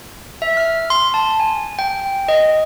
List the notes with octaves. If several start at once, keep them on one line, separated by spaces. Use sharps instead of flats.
E5
F6
C6
A5
G#5
G5
D#5